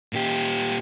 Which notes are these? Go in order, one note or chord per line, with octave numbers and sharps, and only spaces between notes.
A#2 G4